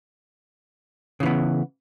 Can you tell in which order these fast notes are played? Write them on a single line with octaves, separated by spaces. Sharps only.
C#3 E3 B3